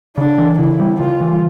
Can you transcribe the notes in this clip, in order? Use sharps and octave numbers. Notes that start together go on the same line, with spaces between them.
C#3 D4
E3
C#3 E4
G3
C#3 F4
E3